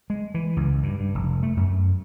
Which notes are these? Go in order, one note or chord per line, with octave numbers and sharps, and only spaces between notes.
G#3
E3
C#2
G2
G2
F1
A3
F#2